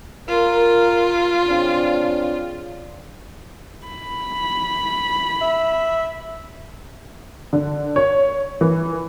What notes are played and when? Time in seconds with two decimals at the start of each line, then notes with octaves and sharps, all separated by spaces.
0.29 F4 A#4
1.46 C#3 C4 D4
3.86 B5
5.42 E5
7.53 D3
7.96 C#5
8.61 E3